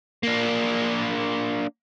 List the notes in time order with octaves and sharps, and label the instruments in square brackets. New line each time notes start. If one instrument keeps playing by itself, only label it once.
[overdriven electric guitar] A#3 D4